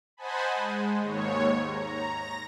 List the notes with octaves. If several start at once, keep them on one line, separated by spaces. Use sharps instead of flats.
C5 D#5 F#5 G#5 A5 B5
G#3
D#2 G#2 C#5
A#5
A#6